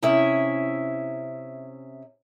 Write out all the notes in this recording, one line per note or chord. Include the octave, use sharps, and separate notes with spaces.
C3 C#4 E4 G#4 E5